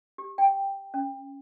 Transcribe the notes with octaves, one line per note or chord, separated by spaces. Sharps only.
G4
G5
C#4